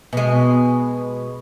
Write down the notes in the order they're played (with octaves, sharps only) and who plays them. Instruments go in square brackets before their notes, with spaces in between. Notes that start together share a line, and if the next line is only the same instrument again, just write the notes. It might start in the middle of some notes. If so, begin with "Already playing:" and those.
[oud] B2 G#3